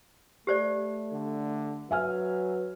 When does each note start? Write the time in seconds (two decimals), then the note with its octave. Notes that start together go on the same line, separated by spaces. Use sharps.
0.47 A3 G4 C5 D5
1.13 D3
1.91 F#3 B4 E5 G#5 F6